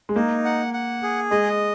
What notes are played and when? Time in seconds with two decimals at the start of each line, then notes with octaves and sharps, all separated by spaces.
0.09 G#3
0.16 A#3 D#4
0.45 F#5
0.73 F#5
1.03 G#4
1.31 G#3 D#5